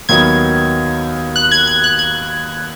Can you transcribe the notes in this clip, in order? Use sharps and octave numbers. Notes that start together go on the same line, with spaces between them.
D#2 D#3 F#3 B3 G#6
F#6
G#6
G#6
F#6
G#6